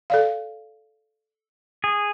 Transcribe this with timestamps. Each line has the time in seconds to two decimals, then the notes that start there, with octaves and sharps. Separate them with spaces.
0.10 A4 D5 F5
1.84 G#4